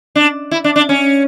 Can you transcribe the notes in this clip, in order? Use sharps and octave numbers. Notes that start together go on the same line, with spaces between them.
D4
E4
D4
D4
C#4